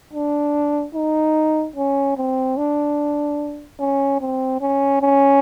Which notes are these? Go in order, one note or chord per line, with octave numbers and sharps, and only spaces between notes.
D4
D#4
C#4
C4
D4
C#4
C4
C#4
C#4